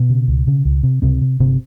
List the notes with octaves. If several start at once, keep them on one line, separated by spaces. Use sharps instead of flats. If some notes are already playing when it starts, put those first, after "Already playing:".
Already playing: B2 B3
C#3
C#2
C#3
C#2
C3
C#2 C3 C4
C3
G1 C3 C4